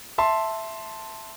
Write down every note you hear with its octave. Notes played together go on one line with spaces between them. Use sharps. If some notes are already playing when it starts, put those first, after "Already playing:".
E5 A5 C6